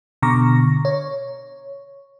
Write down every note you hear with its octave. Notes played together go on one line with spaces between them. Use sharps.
B2 D3 A#5 C#6 A#6
C#5